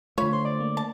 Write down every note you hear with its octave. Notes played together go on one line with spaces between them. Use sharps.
D3 A3 F4 C#5 B5
C5 C6
D5
A#3
A5